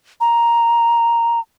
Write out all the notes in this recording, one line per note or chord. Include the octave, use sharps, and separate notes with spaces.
A#5